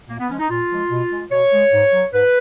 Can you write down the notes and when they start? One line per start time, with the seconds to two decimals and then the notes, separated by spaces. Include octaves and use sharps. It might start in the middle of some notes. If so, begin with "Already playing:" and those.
0.08 A#2 A#3
0.18 B3
0.29 F3 G#3 C#4
0.39 D#4
0.49 A#2 F4
0.69 F3 G#3
0.90 B2
1.11 G#3
1.31 B2 C#5
1.52 G#3
1.73 G#2
1.93 F#3
2.13 G#2 B4